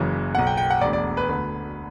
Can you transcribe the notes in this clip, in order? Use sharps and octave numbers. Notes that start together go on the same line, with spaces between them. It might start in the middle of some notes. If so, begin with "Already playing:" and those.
Already playing: F#1 F#2 C#3 E3
B1 B2 F#5
G5
G5
F#5
E1 D2 D3 D5
D5
B4
D2 D3 B4